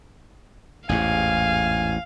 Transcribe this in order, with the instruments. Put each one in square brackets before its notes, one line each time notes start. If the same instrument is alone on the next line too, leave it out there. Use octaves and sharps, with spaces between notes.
[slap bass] A1 E2 G#2 [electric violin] F5 [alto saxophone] G#5